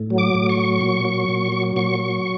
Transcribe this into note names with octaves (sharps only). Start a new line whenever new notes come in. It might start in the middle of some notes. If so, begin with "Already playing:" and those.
Already playing: A2
F#3
D6
A2
C#6
F#3
A#2
F#3
A#2
F#3
A#2 C#6
F#3